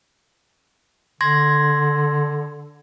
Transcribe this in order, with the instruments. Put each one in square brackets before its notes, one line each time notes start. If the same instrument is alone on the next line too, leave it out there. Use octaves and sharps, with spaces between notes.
[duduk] D3 [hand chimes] C6 G#6 A#6